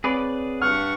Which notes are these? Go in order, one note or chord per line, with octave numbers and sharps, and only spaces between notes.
C4 G#4 B4 C#5 D5
G2 F#5 C#6 F6